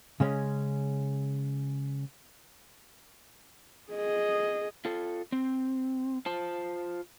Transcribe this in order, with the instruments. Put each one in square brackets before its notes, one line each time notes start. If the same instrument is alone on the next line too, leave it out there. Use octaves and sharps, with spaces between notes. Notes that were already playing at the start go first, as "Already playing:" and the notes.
[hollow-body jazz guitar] C#3 G#3 C#4
[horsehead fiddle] G#4 D#5
[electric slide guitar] F4 A4
C4
F4 C5 A5